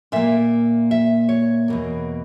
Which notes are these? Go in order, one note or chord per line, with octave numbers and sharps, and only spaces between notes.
A#2 A#3 E5
E5
C#5
E2 B2 A#3